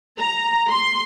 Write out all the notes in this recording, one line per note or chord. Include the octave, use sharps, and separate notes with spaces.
A#5
C6